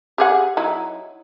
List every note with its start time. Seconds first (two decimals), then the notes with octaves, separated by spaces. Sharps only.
0.18 G4 G#4 F#5
0.57 F#3 D#4 E4